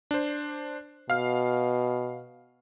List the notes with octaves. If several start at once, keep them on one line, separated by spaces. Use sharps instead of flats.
D4 C5
B2 F5 F6